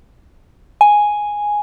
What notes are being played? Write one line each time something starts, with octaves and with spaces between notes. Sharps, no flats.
G#5